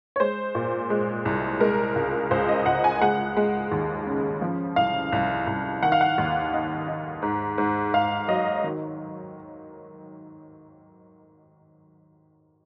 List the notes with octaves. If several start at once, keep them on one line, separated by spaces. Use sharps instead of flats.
C#5
G#3 C5
A#2
G#3
C2
G#3 A#4
C#2
C#2 C5
D#5
C#2 F#5
G#5
G#3 F#5
G#3
D#2
C#3
F3
C2 F5
C2
C2
D#3 F#5
F5
F#5
D#2
D#4
D#4
G#2
G#2
G#2 F5
F#3 D#5
D#3